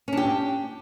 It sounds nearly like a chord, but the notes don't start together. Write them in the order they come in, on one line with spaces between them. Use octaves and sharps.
C#4 D4 G4